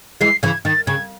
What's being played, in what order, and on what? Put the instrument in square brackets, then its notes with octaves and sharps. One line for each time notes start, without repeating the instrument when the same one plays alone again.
[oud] E3 G#3 [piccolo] C7
[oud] C#3 E3 [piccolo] G#6
[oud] D#3 [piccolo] A6
[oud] C#3 [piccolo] G#6